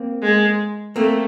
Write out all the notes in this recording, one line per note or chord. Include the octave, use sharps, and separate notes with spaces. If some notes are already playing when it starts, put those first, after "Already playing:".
Already playing: A#3 C4
G#3
A3 A#3 C4